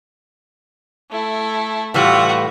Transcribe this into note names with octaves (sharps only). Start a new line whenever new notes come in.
A3 E4
A2 E3 G3 F4 F#4